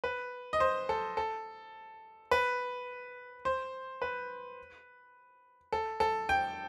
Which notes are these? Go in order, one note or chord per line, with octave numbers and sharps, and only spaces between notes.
B4
D#5
C5
A4
A4
B4
C5
B4
A4
A4
G5